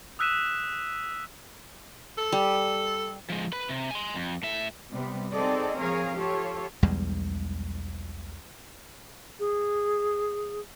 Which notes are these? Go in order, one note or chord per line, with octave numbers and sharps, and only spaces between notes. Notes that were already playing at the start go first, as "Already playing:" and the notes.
D#6 E6 F#6 B6 D#7 E7
A4
G3
F3 G#3
B4 B5
C3
G#5 C6
F2
A2 E5
C3 G3 B3
C4 D#4 G#4 A4 D5 D#5
F3 C4 G#4 A#4 C#5 F5
F4 G4 A4 C#5
B1 E2 G3 G#3
G#4